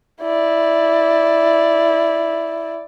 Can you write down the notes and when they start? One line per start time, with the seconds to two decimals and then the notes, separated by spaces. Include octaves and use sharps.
0.22 E4 D5